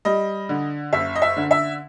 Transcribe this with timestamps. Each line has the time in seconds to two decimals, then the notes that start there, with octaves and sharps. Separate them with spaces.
0.05 G3 D#5
0.49 D3
0.93 F#1 E5
1.16 D#5
1.22 E5
1.37 D3
1.51 E5